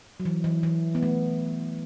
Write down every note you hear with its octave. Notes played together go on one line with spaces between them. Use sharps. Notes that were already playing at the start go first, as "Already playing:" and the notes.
F#3
E3
E3
E3
B3
A3